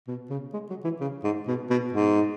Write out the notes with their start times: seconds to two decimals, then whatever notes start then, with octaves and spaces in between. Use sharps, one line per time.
0.08 B2
0.30 C#3
0.53 G#3
0.70 F#3
0.84 E3
1.00 C#3
1.24 G#2
1.48 B2
1.70 B2
1.93 G#2